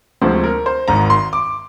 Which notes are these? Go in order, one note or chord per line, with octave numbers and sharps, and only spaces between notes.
D2 C3 F3 G#3 C5
A#4
C5
G#1 G#2 D#3 A#5
C6
D6